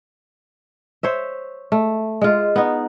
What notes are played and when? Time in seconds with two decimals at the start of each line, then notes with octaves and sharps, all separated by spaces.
1.03 C5 C#5 E5
1.72 A3
2.21 G#3 F4
2.56 B3 D#4